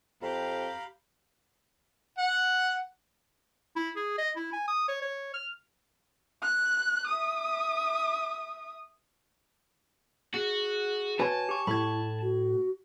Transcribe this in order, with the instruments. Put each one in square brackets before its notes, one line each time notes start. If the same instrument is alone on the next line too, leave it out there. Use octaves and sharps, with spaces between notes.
[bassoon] F2 [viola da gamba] G4 [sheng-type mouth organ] F5 A#5 B5
[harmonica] F#5
[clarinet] E4
G#4
D#5
E4
G#5
D#6
C#5
C#5
F6
[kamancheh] F#6
E5 D#6
[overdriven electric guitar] F#4 [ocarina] G#4 [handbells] C#7
[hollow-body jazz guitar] F#4 B4 [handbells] C#5 G#5 [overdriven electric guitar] A5
[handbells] G4 C#6
[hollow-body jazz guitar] A2 A3 [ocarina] E4 [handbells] B5 G#6
[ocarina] F#4